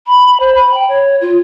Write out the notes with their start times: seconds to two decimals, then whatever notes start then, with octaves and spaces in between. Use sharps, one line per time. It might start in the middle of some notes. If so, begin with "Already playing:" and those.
0.07 B5
0.40 C5
0.55 B5
0.74 G5
0.88 C#5
1.21 F4